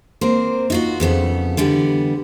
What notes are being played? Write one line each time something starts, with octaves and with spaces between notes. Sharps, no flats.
A#3 C4 A#4 C5
D#4 F4 F#4
F2 C#3 B3 A4
D3 E3 G3 B3